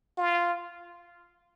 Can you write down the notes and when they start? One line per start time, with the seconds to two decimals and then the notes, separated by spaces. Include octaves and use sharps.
0.18 F4